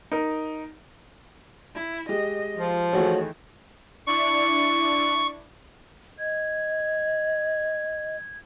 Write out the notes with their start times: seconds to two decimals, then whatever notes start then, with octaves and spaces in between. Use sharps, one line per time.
0.11 D#4 A#4
1.75 E4
2.09 G#3 G4 D#5
2.57 F3 F4
2.93 D#3 E3 A3 F#4 G#4 A4 C#5
4.07 D4 E4 D5 C#6
6.19 D#5 G#6